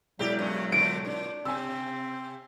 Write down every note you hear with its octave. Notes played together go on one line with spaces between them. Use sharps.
E1 F#3 E4 G4 D5
G2 C#4
A#2 D3 A3 D7
A#2 D4
C3 C4 G#5 E6